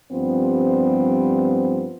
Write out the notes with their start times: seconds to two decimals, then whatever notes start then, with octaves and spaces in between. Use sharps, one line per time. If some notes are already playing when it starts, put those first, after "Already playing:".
0.12 G2 F3 G3 B3 C4